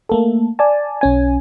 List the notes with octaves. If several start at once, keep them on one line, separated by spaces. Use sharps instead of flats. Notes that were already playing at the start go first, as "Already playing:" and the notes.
A3 A#3 A4
D5 G#5 A5
B1 C#4 G#5